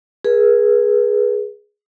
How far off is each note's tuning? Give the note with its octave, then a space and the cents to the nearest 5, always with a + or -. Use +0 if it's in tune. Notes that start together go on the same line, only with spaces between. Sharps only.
G#4 +0 B4 -35